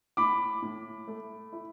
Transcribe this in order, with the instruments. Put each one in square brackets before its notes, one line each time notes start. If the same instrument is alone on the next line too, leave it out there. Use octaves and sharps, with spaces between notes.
[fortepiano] A2 [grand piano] B5 D6
[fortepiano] A2
A3
E4